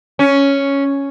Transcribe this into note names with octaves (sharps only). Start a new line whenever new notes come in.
C#4